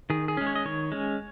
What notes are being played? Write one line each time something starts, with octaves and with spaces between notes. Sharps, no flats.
D#3 G#4
G#4
G#3 C#4
C#5
D#5
D#3 C#5
G#3 C#4